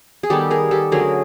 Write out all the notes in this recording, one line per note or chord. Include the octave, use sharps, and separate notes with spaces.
G#4
D#3 G3 B3 G4 A4
G#4 A#4
G4 A4
D3 F#3 A3 C#4 G#4 A#4